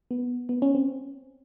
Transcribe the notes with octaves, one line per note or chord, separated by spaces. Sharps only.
B3
B3
C#4
C4